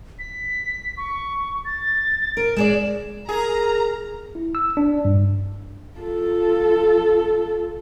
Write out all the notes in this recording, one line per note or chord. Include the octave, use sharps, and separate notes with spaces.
B6
C#6
A6
A#4 D7
G#3 G#4 D5 E7
G#4 A#4 A#5
E4
E6
D4
G2
F4 A4